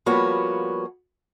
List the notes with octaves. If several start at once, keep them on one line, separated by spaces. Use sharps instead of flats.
F3 G3 A#3 B3 F#4 C#5